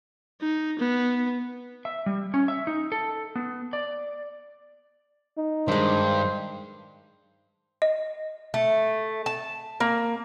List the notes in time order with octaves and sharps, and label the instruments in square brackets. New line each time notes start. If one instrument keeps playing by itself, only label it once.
[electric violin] D#4
B3
[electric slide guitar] E5
G3
C#4
E5
D#4
A4
B3
D5
[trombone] D#4
[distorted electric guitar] G2 [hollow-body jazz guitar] D#3 G#3 [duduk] C5
[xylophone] D#5
[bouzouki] A3
A5
A#3